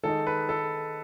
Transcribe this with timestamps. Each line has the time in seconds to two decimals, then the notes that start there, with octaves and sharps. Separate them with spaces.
0.03 D#3 G#3 D#4 A4
0.27 B4
0.49 A4